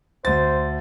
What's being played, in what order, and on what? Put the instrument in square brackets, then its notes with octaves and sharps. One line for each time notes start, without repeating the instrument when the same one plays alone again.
[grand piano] D2 A6 [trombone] C5